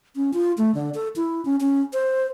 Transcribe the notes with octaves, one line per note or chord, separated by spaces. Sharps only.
C#4
F4
A3
D3
A4
E4
C#4
C#4
C5